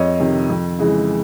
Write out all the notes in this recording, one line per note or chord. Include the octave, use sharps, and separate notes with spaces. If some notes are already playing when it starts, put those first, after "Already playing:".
Already playing: F2 C#5 D#5
C3 D#3
F2
C#3 E3 G#3